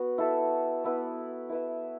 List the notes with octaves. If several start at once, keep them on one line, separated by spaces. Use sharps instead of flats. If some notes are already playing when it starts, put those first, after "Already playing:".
Already playing: B3 F#4 B4
E4 A4 E5
B3 E4 B4
E4 B4 E5